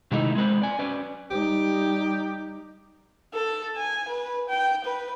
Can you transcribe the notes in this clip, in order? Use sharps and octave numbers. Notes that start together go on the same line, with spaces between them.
C3 D#3 G#3 A3 D#4 E4
G#3 C4 B4 C5
D5 G#5
C#4 B4 D5
G3 D#4 G4
A4
G#5
B4
G5
B4